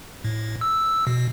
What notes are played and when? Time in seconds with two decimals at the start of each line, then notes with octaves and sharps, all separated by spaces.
0.24 A2
0.61 E6
1.07 B2